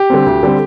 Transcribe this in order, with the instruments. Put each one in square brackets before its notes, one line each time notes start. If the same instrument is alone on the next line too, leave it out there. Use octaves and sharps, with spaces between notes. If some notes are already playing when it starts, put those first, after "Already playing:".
Already playing: [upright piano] G4
D3 G3 C4
D2
D3 G3 C4